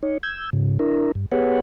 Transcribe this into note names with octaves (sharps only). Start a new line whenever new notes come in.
D#4 C#5
E6 G6 G#6
G#2 C#3
D4 E4 A#4
G2
B3 G4 G#4 B4 C#5 F#5